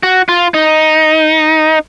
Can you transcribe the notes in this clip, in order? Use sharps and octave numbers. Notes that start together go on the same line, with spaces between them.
F#4
F4
D#4